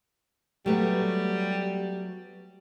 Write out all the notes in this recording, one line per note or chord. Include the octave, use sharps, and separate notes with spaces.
F#3 G3 A3 B3